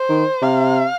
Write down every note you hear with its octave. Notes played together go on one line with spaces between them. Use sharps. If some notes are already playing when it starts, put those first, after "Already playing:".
Already playing: C5
D#3
C3 F5